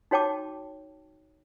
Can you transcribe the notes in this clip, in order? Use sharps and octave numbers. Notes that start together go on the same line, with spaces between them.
D#4 F#4 C#5 G5 A5 D6